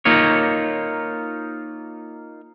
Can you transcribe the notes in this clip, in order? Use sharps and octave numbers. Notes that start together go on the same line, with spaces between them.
A#3 D#4 F4 C#5